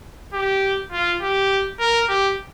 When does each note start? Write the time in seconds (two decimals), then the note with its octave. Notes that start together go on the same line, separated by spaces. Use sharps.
0.34 G4
0.92 F4
1.22 G4
1.80 A#4
2.09 G4